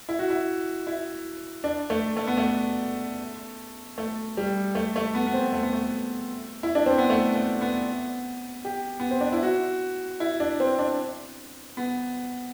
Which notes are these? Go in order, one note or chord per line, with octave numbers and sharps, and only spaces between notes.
E4
F#4
E4
E4
D4
A3
A3
B3
A3
A3
G3
A3
A3
B3
B3
C4
A3
B3
A3
E4
D4
C4
B3
A3
A3
B3
G4
B3
C4
D4
E4
F#4
E4
D4
C4
D4
B3